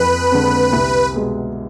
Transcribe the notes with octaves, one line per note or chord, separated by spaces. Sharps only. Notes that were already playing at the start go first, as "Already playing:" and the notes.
Already playing: F2 B4
D3 G#3 C4
C2
B2 G#3